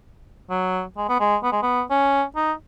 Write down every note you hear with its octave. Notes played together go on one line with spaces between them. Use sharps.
F#3
G#3
B3
G#3
B3
G#3
B3
C#4
D#4